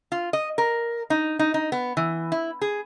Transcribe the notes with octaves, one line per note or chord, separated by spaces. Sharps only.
F4
D#5
A#4
D#4
D#4
D#4
B3
E3
E4
G#4